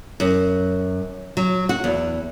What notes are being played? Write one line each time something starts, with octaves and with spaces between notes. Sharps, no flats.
F#2
F#3
F#4
E2